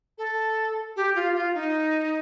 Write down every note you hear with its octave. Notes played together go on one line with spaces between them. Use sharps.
A4
G4
F4
F4
D#4